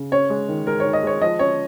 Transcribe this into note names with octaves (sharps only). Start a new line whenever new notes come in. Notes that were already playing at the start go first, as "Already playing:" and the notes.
Already playing: C#3
C#4 C#5
G#3
D#3
G#3 A#4
D#3 C#5
D#5
G#3 C#5
F3 D#5
C#4 C#5